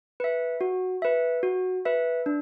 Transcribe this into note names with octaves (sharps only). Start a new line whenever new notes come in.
B4 E5
F#4
B4 E5
F#4
B4 E5
D4